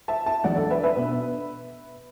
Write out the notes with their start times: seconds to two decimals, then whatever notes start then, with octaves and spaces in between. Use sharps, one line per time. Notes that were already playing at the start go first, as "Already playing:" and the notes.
0.08 E5 A5
0.26 E5 A5
0.44 E2 D3 F#3 D5 F#5
0.57 A4 D5
0.70 B4 E5
0.83 B4 E5
0.96 B2 B3 D4